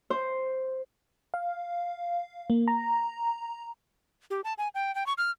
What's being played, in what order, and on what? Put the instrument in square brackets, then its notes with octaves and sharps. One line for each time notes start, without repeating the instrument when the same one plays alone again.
[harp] C5
[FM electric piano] F5
A#3
A#5
[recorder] G4
A5
G#5
G5
G5
C#6
F6